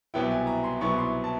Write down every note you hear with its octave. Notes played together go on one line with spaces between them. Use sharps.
C2 B2 F#3 B3 E4 G5
G#5
A#5
C6
C2 B2 F#3 B3 E4 C#6
C6
A5